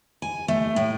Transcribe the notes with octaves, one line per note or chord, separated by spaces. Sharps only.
G#5
A3
A2